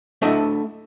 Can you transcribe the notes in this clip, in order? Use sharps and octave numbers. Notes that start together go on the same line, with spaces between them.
A3 D4 E4 A4 D#5 E5